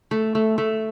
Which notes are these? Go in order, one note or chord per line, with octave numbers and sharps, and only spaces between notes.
A3
A3
A3